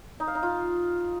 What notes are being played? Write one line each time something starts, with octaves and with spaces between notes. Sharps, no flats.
D#4
F5
D#4
F4